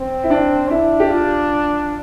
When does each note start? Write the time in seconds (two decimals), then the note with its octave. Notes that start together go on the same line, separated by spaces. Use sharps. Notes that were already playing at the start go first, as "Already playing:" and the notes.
Already playing: C4
0.23 E4
0.30 D4
0.70 D4 E4
1.00 G4
1.10 F4